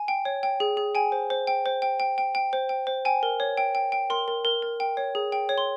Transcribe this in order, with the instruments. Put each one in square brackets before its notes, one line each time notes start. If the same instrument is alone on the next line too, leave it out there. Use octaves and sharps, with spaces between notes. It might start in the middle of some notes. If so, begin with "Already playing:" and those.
Already playing: [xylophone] G#5
G5
C#5
G5
G#4
G#4
G5 G#5
C5
C5
G5
C5
G5
G5
G5
G5
C5
G5
C5
G5 G#5
A#4
C#5
G5
G5
G5
A#4 C6
A#4
A#4
A#4
G5
C#5
G#4
G5
C#5
C6